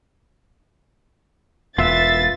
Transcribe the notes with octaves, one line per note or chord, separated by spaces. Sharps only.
E1 B3 F4 E5 A6